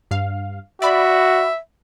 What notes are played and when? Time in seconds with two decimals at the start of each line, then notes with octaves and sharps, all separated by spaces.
0.11 G2 F5
0.82 F#4 D5 E5 B5